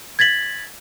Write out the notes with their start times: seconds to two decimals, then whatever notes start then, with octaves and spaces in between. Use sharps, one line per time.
0.19 G#6 A6 B6 F#7